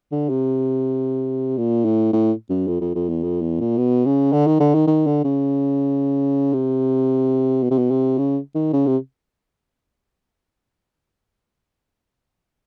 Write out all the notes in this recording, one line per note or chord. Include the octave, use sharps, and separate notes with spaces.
D3
C3
A#2
A2
A2
F#2
F2
F2
F2
E2
F2
E2
A#2
B2
C#3
D3
D#3
D3
D#3
D#3
D3
C#3
C3
B2
C3
B2
C3
C#3
D#3
C#3
C3